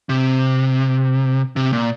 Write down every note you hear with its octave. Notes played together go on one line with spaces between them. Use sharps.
C3
C3
A#2